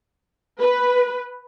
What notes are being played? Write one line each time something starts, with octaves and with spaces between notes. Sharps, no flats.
B4